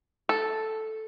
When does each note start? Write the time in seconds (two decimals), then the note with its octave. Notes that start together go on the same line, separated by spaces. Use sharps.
0.29 A4